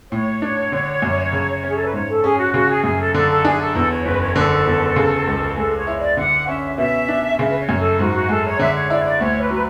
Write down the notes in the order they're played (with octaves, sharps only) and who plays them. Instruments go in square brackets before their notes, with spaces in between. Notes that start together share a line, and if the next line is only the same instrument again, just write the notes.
[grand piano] A2 [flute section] C#5
[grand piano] D4
D3
F#2
C#3
C#4
[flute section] G#4
A4
B4
[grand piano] G#2 [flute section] C#5
[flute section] A4
[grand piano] C#4 [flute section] G#4
[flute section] F#4
[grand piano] C#3 [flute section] F#4
[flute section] G#4
[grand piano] F#2 [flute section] G#4
[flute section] A4
[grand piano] D3 [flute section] A4
[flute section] A4
[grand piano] D4 [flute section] G#4
[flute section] A4
[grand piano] E2 [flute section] A4
[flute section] C#5
[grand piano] F#1 [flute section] B4
[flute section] C#5
[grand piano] D3 [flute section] A4
[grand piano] E2
C#3
C#2
[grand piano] G#3 [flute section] A4
[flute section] C#5
[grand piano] E4
[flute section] D5
[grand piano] D3 [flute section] F#5
[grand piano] C#4 [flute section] E5
[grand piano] B2 [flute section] E5
[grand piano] D4
[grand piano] C#3 [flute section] E5
[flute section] B4
C#5
[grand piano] F#2
[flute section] A4
[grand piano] G#2 [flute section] F#4
[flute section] F#4
[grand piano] G#3 [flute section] A4
[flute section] C#5
[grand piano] D3 [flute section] E5
[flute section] C#5
[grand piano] E4 [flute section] D5
[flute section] C#5
D5
[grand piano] D2 [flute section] C#5
[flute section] B4
[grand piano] F#3 [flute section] B4